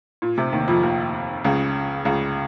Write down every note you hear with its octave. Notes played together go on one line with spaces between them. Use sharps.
A#2
C3
D#2 D#3
F2 F3
D#2 D#3
C#2 C#3
C#2 C#3